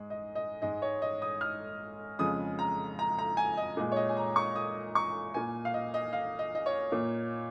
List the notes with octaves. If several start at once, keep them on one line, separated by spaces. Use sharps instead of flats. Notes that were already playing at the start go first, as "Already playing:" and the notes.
Already playing: G#2 G#3
D#5
D#5
G#2 G#3 D#5
C#5
D#5
D#6
F6
F2 C#3 G#3 D#6
A#5
A#5
A#5
G#5
D#5
A#2 G#3
C#5
D#5
G#5
A#5
C#6
D#6
C#6
A#2 A#3 G#5
F5
D#5
D#5
F5
D#5
D#5
C#5
A#2 A#3